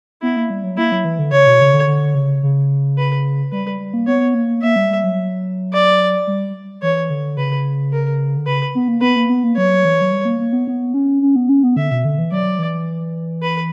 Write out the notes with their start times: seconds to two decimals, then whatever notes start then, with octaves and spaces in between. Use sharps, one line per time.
0.22 B3 E4
0.36 A#3
0.50 G3
0.64 F#3
0.77 A#3 E4
0.92 F#3
1.04 E3
1.19 D3
1.32 C#3 C#5
1.46 B2
1.61 C#3
1.74 D3
1.87 D3
2.15 C#3
2.43 C#3
2.98 B4
3.52 G3 B4
3.66 G3
3.80 G3
3.94 A#3
4.07 B3 C#5
4.34 A#3
4.62 A#3 E5
4.76 G3
4.89 G3
5.04 F#3
5.73 D5
6.27 G3
6.82 E3 C#5
7.10 D3
7.37 C#3 B4
7.93 A#4
8.36 D3
8.47 C#3 B4
8.75 B3
8.88 A#3
9.01 B3 B4
9.16 A#3
9.30 B3
9.44 A#3
9.57 F#3 C#5
9.85 E3
10.01 F#3
10.12 G3
10.25 A#3
10.40 A#3
10.53 B3
10.67 B3
10.94 C#4
11.22 C#4
11.36 B3
11.49 C#4
11.63 B3
11.76 D3 E5
11.91 B2
12.05 D3
12.18 E3
12.32 F#3 D5
12.59 E3
13.42 B4